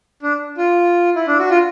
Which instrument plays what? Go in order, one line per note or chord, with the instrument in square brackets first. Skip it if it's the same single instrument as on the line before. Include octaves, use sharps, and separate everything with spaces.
[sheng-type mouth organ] D4
F4
E4
D4
F#4
F4